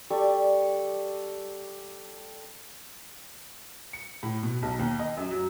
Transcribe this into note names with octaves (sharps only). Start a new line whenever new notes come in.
G3 A4 D5 C#6
C#7
A2
B2
B1
D#2
D#5
F#2
F#3